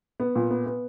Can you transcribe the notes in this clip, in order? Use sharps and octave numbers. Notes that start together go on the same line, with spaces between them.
B3
A#2
B3
B3